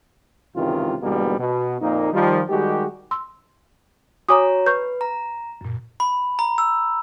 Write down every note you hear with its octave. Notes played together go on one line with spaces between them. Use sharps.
G#1 C#2 C3 D#3 E3 F4
E2 G#2 B2 D3 G3 A#3
B2
F2 A#2 A#3 D#4
D#3 F3 G3
D#3 G3 G#3 F#4 G4
C6 E6
F#4 C#5 G#5 A#5 D6 D#6
B4 C#6 G6
A#5
F#2 A#2
B5
A#5
E6